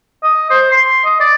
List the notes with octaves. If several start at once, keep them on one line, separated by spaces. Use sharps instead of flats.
D#5
C5
C6
D#5
D5